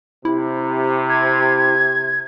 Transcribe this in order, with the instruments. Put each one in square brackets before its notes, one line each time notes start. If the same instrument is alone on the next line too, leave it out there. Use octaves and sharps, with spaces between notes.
[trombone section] C3 [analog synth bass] E4
[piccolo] G#6